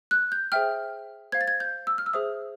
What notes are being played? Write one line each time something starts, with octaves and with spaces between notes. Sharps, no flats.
F#6
G6
G#4 C5 E5 G5 F6
C5 F5 G#6
A6
G#6
G6
E6
F6
E6
G#4 C5 E5 D#6